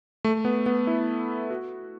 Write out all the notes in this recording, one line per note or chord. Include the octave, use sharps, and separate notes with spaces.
A3
B3
B3
E4
F#4